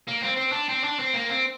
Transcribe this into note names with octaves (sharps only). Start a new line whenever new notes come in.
A#3
C4
C4
D4
C4
D4
C4
A#3
C4